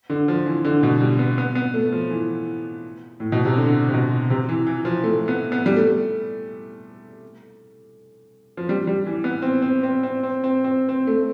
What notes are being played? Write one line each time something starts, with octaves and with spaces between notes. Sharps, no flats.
D3
F3
E3
D3
B2
G3
B3
B3
B3
A3
F3
E3
A2
B2
C3
D3
C3
B2
C3
E3
E3
F3
A3
B3
B3
G3
A3
F3
G3
G3
E3
B3
C4
C4
C4
C4
C4
C4
C4
C4
A3